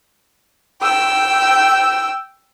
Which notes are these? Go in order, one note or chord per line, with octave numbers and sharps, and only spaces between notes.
G5 E6